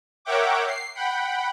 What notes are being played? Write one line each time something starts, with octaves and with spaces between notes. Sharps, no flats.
A#4 C#5 E5 F#5 G5 D6
C7
F#5 G5 B5